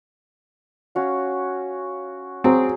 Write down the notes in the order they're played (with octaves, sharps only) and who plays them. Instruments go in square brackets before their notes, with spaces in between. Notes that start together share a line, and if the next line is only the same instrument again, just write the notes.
[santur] C#4 F#4 F5
[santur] F#3 G#4 [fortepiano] C4